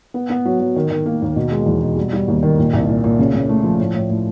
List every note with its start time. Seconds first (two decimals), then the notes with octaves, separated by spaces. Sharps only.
0.14 B3
0.30 B3
0.45 F#3
0.60 F#3
0.76 D#3
0.91 D#3
1.06 A#3
1.22 D#2
1.36 B2
1.51 G#3
1.66 E2
1.82 B2
1.96 G3
2.13 G3
2.28 D#2
2.43 D#3
2.58 A#2
2.73 C2
2.89 A#2
3.04 A#2
3.19 C#3
3.34 C#3
3.49 A3
3.64 F3
3.79 A2
3.94 A2
4.10 A2